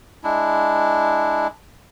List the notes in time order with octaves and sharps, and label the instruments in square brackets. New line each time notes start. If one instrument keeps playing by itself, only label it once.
[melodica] G#3 D4 E4